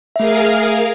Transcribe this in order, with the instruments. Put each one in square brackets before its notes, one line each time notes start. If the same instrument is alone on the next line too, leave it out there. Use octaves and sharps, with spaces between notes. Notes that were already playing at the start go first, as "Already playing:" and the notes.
[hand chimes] A3 E5 [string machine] G#4 A#4 F5